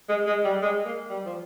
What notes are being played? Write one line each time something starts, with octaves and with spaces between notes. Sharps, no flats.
G#3
G#3
G3
G#3
A#3
G3
F3